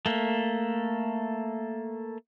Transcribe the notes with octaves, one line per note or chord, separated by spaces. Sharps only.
A3 A#3